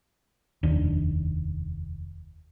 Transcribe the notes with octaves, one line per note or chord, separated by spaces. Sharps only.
F1 D#2 D4